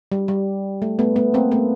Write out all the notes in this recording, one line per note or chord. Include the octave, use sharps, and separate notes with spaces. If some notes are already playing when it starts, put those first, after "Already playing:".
G3
G3
A3
A3 B3
A3 B3
A#3 C4
A3 B3